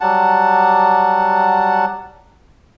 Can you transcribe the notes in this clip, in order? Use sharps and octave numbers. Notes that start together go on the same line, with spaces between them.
F#3 G3 F#5 A5